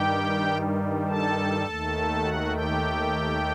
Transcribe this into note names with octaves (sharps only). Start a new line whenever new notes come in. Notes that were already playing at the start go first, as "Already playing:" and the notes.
Already playing: G2 D#3 G3 G4 G5
A4 A5
D#2 D#3 A3
F#4 F#5
G4 G5